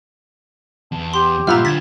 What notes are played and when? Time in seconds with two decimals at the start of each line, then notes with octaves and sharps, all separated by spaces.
0.92 E2 A5
1.14 G4 C6
1.47 G2 A#2 F4 E5 F#5 A#5 B5 F6
1.65 D3 E4 G#6 A6 B6